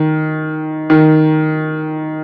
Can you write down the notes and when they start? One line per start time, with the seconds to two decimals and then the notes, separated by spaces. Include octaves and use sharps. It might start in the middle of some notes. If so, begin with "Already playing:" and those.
Already playing: D#3
0.90 D#3